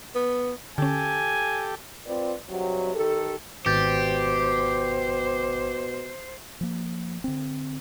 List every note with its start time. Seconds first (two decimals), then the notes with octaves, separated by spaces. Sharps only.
0.15 B3
0.78 D3 C#4 G4 A4 G#5
2.06 C4 F4 B4 D5
2.49 G2 C3 F#3
2.95 D#3 G4 A4
3.66 G#1 B2 G4 C5 G6 A6
6.61 F3 A#3
7.24 D3 C4